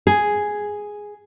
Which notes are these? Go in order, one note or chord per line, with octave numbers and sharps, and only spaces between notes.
G#4